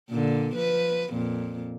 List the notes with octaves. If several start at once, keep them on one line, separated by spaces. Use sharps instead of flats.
A#2 D3
F3 B4
F2 A#2